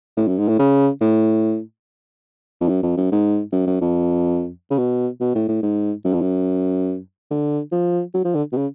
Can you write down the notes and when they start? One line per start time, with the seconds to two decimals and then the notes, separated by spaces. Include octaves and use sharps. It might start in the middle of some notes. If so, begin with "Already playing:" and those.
0.17 A2
0.28 F#2
0.38 G#2
0.48 A2
0.59 C#3
1.01 A2
2.61 F2
2.69 F#2
2.83 F2
2.97 F#2
3.12 G#2
3.52 F#2
3.67 F#2
3.81 F2
4.71 C#3
4.78 B2
5.21 B2
5.35 A2
5.48 A2
5.63 G#2
6.05 F#2
6.13 F2
6.21 F#2
7.31 D3
7.72 F3
8.14 F#3
8.25 F3
8.35 D3
8.53 B2
8.57 C#3